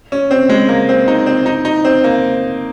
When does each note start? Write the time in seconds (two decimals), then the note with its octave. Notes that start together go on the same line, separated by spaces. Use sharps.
0.12 C#4
0.31 C4
0.49 G#3
0.69 A#3
0.89 C4
1.08 D#4
1.26 C4
1.46 D#4
1.65 D#4
1.85 C4
2.04 A#3